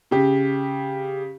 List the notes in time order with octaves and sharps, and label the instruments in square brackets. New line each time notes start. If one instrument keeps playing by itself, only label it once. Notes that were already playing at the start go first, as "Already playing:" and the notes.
[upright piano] C#3 G4